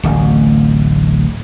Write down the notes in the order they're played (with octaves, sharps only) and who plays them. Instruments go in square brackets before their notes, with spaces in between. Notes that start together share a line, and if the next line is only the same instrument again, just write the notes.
[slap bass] D1 A1